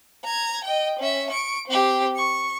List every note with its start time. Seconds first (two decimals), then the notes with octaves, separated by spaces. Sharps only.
0.24 A#5 G#6
0.64 D#5 G5
0.99 C#4 E5
1.30 C#6 D7
1.68 C4 G4
2.16 C#6